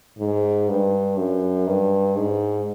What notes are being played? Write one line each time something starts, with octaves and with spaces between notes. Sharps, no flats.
G#2
G2
F#2
G2
G#2